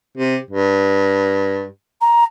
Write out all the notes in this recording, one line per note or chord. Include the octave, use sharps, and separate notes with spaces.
C3
G2
A#5